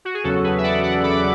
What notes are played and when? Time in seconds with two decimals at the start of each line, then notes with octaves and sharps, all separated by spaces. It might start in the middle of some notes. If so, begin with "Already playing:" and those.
0.05 F#4
0.14 G#4
0.24 E2 C#3 F#3 C#4 F#4 A4
0.44 G#4 B4
0.58 E5
0.63 D5 F#5
0.83 D5 F#5
1.03 B5 D6
1.14 D6